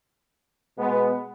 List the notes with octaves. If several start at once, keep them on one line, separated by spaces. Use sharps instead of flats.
B2 G#3 B3